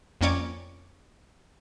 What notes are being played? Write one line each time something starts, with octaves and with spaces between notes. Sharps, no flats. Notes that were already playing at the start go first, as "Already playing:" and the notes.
F2 A#3 C#4 C#5 D5 D6